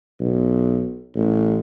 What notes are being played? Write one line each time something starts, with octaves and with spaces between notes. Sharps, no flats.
B1
A1